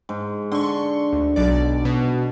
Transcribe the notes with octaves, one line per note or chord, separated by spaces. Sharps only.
G#2
D3 C6 C#6
D2
B1 D5
B2